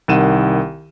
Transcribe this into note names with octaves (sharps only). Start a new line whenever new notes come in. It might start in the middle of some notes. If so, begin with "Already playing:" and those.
C2 D#3 F#5 D#7 E7